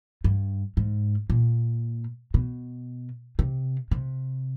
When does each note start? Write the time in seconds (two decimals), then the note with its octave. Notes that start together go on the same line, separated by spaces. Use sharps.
0.24 G2
0.77 G#2
1.30 A#2
2.34 B2
3.39 C3
3.91 C3